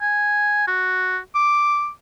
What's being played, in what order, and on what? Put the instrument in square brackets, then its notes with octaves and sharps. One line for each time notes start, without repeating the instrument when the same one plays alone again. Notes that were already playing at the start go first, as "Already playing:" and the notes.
[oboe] G#5
F#4
D6